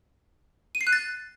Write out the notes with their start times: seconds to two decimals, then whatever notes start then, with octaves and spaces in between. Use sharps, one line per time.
0.75 D#7
0.81 C7
0.87 F#6
0.93 A6